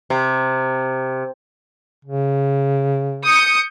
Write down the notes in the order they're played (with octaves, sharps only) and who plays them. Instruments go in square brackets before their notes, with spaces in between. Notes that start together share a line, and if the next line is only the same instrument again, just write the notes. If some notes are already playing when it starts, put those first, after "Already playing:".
[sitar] C3
[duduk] C#3
[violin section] D#6 G6 C#7